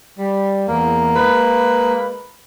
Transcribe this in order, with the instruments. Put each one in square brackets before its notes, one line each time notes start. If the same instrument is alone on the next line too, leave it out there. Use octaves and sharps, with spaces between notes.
[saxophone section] G3
[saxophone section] E2 [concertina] A#3
[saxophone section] G#3 B4